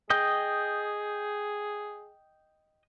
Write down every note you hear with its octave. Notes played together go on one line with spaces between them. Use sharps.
G#4 D#5 G5